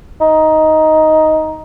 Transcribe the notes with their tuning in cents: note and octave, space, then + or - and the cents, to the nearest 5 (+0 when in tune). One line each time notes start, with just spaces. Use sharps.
D#4 +10